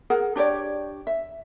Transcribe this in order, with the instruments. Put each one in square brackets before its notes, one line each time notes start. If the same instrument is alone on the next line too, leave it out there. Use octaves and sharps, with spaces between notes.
[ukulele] G#4 A#4 F#5
D4 G4 C#5 D5
E5